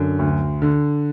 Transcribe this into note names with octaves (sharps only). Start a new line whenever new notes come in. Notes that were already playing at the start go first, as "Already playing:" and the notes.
Already playing: F#2 D3
D2
D3